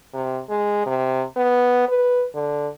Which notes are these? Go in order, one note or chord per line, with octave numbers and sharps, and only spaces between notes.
C3
G#3
C3
B3
B4
D3